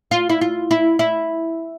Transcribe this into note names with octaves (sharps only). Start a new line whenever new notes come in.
F4
E4
F4
E4
E4